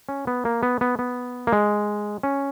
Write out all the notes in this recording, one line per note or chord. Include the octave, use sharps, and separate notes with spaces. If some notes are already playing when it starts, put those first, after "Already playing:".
C#4
B3
A#3
B3
B3
B3
A#3
G#3
C#4